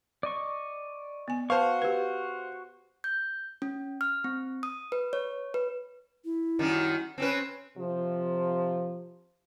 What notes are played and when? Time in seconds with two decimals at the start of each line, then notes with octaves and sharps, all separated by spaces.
0.23 D5 D#5 C#6
1.28 B3 G#5
1.50 F#4 B4 C5 F5 A5 C#6
1.82 G4 B4
3.04 G6
3.62 C#4
4.01 F6
4.24 C4
4.63 D#6
4.92 B4
5.13 C#5
5.54 B4
6.25 E4
6.59 F#2 D#3 G3
7.18 C4 C#4 B4
7.77 C3 F3